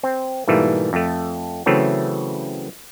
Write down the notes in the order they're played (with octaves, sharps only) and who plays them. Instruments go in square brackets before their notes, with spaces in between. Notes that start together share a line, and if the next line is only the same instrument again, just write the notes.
[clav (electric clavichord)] C4
G#2 B2 E3 G3 A3 A#3
F2 A3
C#3 E3 F#3 A3 C4